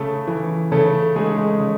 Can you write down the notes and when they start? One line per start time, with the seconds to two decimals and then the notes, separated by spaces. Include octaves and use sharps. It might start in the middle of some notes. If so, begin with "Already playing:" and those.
Already playing: C#3 A3 A4
0.27 E3
0.72 C#3 A3 A4
1.16 G#3 A3 G#4
1.37 G#3 G#4
1.60 C#3